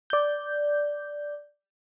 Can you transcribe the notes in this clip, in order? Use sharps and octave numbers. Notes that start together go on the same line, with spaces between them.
D5 G6